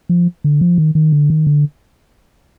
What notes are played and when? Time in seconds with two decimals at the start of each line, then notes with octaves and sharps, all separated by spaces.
0.09 F3
0.44 D3
0.61 F3
0.78 D#3
0.95 D#3
1.12 D3
1.30 D#3
1.47 D3